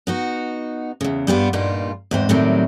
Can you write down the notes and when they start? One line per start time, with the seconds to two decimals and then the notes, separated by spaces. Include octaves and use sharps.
0.07 B3 D#4 F#4
1.01 E2 C#3
1.27 G2 G3 B3 F4
1.53 G2 A#2 G3 D#4 F4
2.11 E2 G#2 C4
2.29 A2 C3 D#3 F#3 G3